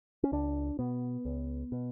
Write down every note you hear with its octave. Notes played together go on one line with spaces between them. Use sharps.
C#4
C#2 D4
B2 B3
C#2
B2